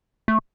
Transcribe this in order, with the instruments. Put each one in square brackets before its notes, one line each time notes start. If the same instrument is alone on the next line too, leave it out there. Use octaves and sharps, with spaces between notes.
[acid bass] A3